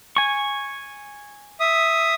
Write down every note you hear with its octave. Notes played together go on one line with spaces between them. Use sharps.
G#5 C#6
E5 D#6